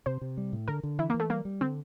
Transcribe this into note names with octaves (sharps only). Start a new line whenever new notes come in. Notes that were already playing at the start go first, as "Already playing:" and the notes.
C3 C5
C3
G3
A2
D3 A#4
D3
E3 E4
A#3
E3
A3
G3 A#3
G3
D3 C4